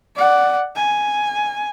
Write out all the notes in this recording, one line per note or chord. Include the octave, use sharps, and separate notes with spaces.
D5 F#5
G#5